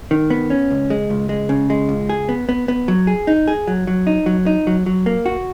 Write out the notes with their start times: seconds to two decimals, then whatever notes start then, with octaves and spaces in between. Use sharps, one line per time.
0.11 D#3
0.30 B3
0.50 C#4
0.70 C#2
0.90 G#3
1.10 C#2
1.29 G#3
1.49 C#3
1.70 G#3
1.89 C#2
2.09 G#4
2.29 B3
2.49 B3
2.68 B3
2.88 F#3
3.07 G#4
3.27 D#4
3.48 G#4
3.67 F#3
3.87 F#3
4.07 D#4
4.26 F#3
4.46 D#4
4.67 F#3
4.86 F#3
5.06 A#3
5.26 F#4